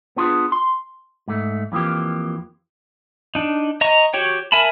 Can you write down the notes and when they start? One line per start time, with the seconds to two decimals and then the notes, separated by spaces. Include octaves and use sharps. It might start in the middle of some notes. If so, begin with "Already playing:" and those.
0.16 B3 D4 F4 F#4 G#4 B4
0.52 C6
1.28 G#2 A3
1.72 F2 E3 F3 A#3 G4
3.35 D4 D#4
3.81 D#5 A#5 C#6
4.14 F#4 G4 C#5 G5
4.52 A#4 E5 G#5 A5 B5